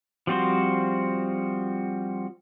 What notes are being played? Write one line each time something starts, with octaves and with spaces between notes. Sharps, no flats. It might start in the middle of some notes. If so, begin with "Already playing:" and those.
F3 G3 C4 F#4 C5